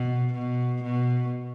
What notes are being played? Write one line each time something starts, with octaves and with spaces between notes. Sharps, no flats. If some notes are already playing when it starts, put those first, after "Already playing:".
Already playing: B2
B2
B2